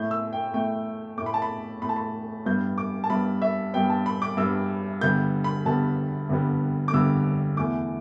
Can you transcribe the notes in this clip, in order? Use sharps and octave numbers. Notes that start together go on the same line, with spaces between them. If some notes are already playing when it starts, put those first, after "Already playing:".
Already playing: A2 A3 G6
E6
G5
A2 A3 G5
A2 A3 D6
B5
A5
B5
A2 A3 B5
A5
B5
G2 G3 B3 G6
D6
A5
G2 G3 B3 B5
E5
G2 G3 B3 G5
A5
B5
D6
G2 G3 B3 E6
G2 D3 G3 B3 G6
B5
G2 D3 G3 B3 A5
G2 D3 G3 B3
D6
G2 D3 G3 B3 E6
E2 E3 A3 D6